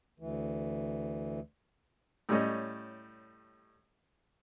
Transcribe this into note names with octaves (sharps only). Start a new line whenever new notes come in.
D2 E3
A2 G3 C#4 D#5